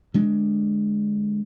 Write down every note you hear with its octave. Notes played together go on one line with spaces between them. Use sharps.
D3 G#3 D4